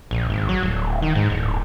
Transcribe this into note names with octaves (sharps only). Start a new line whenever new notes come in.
A#1
G#1
F#3
D1
D#3
G#2
D1